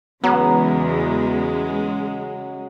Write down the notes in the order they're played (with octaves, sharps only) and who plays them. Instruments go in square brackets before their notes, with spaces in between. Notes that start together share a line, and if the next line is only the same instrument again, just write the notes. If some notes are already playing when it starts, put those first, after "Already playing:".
[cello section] E2 [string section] C#3 G#3 [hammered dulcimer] F#3 [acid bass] B3